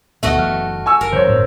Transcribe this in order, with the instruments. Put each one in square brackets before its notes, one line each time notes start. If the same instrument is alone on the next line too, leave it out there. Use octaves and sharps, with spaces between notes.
[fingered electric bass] F1 D2 B2 [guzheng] A3 F#4 D#5 [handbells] B3 E5
[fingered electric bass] F#1 E3 F#3 [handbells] F6
[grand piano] G#5 C#6 E6
[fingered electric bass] F#1 [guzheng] A#4
[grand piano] F#1 C#5 [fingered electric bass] D#3 F3 [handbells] C5
[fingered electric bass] G1 F#2 A2